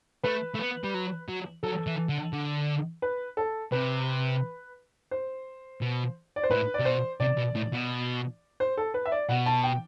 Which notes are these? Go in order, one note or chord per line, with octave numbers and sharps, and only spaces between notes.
A3 B4
A3
B3
G3
F#3
F#3
F#3 A4
E3
D3
D3
B4
A4
C3 B4
C5
B2
D5
C5
A2 B4
D5
C3
B2 C5
C3 D5
B2
A2
B2
C5
A4
B4
E5
D5
B2 F#5
A5
G5